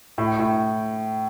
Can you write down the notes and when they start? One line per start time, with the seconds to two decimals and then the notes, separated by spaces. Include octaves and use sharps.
0.18 A2
0.39 A2